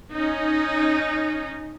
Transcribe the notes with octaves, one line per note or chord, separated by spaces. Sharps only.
C#4 D#4